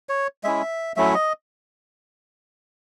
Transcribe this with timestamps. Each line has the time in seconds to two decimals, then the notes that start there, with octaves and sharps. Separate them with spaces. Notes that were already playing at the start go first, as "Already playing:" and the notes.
0.09 C#5
0.44 G#3 C#4 E4 E5
0.97 F#3 A3 C#4 E4 E5
1.14 D#5